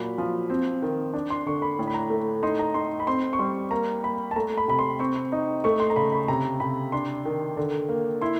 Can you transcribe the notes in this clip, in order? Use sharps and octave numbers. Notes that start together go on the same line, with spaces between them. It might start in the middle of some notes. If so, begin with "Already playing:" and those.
Already playing: A#2 F#3 B5
F3
C4
D#3
D4
C6
D3 C#6
B5
A2
B5
A#5
A3
D#4 C6
A#5
D#4 C6
B5
C4 C6
C#6
G3 C6
A#3 A#5
A#3 B5
A5
A3 A#5
B5
C3 B5
C6
C4 C#6
D#4
A3 C#6
C6
A#5
C#3 B5
B5
C3 A#5
C3 B5
D4 C6
D#3
D3
A#3
E4 C6